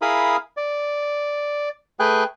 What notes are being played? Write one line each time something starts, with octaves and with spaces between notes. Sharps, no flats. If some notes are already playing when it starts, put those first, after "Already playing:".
E4 G#4 A#4 F5 B5 D#6
D5
A3 G#4 B4 G5 G#5 F#6